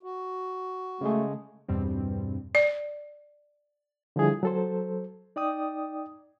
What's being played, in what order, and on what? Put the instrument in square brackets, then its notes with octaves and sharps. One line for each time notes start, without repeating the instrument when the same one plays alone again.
[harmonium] F#4
[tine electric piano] C#3 G#3 G#4 [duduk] A3
[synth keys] E2 G2 B2 G3 C4
[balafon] D5
[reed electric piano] D3 F3 G3 E4 G#4
F#3 A4 C5
D#4 D5 G5 D#6